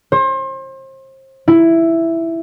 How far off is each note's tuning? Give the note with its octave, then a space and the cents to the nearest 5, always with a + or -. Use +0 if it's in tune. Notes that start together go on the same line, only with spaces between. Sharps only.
C5 +35
E4 +5